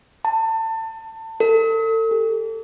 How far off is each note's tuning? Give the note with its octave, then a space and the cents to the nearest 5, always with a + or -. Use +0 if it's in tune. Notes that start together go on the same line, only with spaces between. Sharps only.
A5 +30
A4 +35
G#4 -45